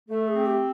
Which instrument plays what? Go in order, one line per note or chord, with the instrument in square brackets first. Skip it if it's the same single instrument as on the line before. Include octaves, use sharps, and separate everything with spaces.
[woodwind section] A3 [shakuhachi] A4
[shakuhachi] G#4
[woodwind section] C4
[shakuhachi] G4